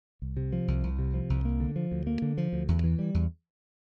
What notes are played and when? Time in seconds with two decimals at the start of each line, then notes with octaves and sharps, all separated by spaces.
0.22 C2
0.37 C3
0.52 F3
0.68 C2
0.84 C2
0.99 C3
1.14 F3
1.30 C2
1.45 A#3
1.60 D3
1.76 F3
1.91 D2
2.07 A#3
2.22 D3
2.38 F3
2.53 D2
2.68 E2
2.84 E3
2.99 G3
3.14 E2